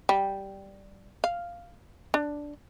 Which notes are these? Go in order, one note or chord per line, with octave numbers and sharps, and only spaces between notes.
G3
F5
D4